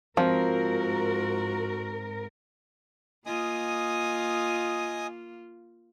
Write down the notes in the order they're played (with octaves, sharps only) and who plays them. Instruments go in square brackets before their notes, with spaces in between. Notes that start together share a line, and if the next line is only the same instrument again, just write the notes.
[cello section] G#2 A#4 [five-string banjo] F3 [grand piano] C4 [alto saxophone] F#4
[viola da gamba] A#3 F4 [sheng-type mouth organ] D#5 G#5 D#6